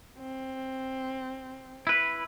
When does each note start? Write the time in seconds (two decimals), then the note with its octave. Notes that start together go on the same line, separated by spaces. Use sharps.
0.18 C4
1.87 E4 B4